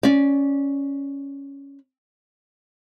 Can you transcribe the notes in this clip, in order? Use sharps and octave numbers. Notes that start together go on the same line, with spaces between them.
C#4 D5